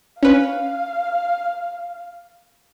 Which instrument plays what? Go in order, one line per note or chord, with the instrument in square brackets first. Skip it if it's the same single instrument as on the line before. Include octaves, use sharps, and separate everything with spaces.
[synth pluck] C#4 B4 [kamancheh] F5